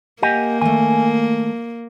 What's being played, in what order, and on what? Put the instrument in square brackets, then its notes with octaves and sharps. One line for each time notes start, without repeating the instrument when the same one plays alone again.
[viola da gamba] A#3 [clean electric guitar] G4 D#5 G#5 [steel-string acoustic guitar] F#5
[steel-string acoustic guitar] D#3 A3 [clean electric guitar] G#5